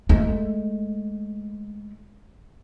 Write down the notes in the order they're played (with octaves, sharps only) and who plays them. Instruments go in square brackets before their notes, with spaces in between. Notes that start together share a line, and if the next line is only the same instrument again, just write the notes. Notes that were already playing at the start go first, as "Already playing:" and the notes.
[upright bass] G#3 A3